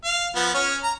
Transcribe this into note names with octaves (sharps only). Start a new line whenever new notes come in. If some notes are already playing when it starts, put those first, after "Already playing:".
F5
F3 B3
C#4 C#5 F6
A#5